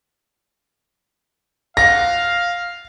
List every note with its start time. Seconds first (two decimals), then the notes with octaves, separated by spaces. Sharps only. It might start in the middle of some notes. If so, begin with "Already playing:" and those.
1.77 F4 C5 F5 F#5 A#6